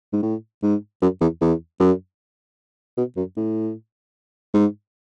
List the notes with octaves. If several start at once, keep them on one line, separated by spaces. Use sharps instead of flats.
G#2
A2
G#2
F#2
E2
E2
F#2
B2
F#2
A2
G#2